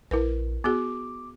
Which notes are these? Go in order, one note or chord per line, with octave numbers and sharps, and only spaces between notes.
A#1 E4 A#4 B4
B3 F#4 G#4 D6